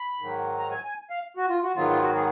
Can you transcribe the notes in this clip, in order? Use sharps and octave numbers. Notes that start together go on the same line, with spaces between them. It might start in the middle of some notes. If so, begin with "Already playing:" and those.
Already playing: B5
G#2 D#3 F#3
A#5
G#5
G#5
F5
F#4
F4
F#4
G#2 D#3 F#3 B3 F4
F4
F#4
G#4